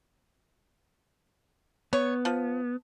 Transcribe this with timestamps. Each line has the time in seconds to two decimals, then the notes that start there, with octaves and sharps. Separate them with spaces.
1.93 B3 C#5
2.25 F3